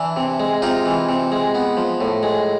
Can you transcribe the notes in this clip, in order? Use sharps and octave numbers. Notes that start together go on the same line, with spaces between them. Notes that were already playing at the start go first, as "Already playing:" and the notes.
Already playing: E3 D4 E4
C3
G#3
C3 D#4 F4
E3
C3
G#3
B3
F3
A2
G#3